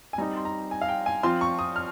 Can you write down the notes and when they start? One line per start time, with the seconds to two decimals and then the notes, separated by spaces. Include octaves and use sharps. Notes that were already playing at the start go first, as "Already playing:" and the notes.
0.13 G#5
0.18 G3 C4 D#4 A#5
0.36 C6
0.45 A#5
0.71 G#5
0.81 F5
0.88 G5
1.06 G#5
1.23 F3 C4 F4 C6
1.41 C#6
1.59 D#6
1.76 F6